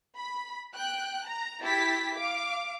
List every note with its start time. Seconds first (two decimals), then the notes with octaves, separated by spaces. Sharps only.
0.18 B5
0.74 G5 F#6
1.26 A#5
1.63 E4 G4 A6 B6
2.15 F5 D6